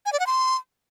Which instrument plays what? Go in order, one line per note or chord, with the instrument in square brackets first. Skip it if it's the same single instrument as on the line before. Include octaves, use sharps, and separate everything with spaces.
[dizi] G#5
D5
F#5
C6